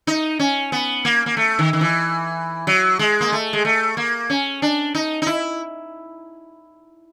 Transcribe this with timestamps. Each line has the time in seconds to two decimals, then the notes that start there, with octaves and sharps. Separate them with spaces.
0.07 D#4
0.39 C#4
0.72 B3
1.05 A#3
1.26 A#3
1.37 A3
1.59 D#3
1.73 D#3
1.81 E3
2.67 F#3
2.99 G#3
3.21 A#3
3.32 A3
3.53 G#3
3.65 A3
3.97 A#3
4.30 C#4
4.62 D4
4.95 D#4
5.22 D#4
5.27 E4